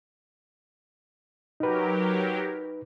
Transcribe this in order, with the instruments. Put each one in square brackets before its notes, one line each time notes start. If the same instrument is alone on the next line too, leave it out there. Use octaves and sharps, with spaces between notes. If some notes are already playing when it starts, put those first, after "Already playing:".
[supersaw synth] F#3 G4 A#4 [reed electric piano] D#4 B4